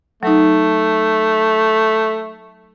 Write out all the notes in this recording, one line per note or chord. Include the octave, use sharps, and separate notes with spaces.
F#3 A3 D#4